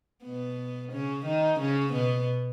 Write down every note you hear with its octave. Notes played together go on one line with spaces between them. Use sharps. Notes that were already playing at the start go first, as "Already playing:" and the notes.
B2 B3
C#3 C#4
D#3 D#4
C#3 C#4
B2 B3